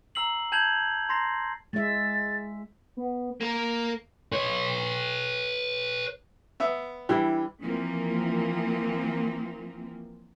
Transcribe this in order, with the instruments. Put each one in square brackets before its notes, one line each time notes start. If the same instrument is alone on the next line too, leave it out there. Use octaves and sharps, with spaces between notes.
[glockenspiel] A#5 E6 C7 F#7
A5 G6 G#6 F7 F#7
A#5 C6 A6 A#6 C7
[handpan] G#3 E5 [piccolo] A6
[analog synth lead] B3
[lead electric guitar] A#3 A#4
[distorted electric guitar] B4 C#5
[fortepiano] B3 E5
[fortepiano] E3 [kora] G3 D4 E4
[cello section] E3 F3 A#3 C4